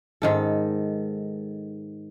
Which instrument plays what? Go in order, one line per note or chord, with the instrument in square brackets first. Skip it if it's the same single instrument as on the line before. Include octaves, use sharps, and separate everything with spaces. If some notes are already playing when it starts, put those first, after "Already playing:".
[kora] G#2 D#3 A4